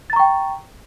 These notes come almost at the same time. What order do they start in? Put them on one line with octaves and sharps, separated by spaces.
A6 A#5 C#6 G5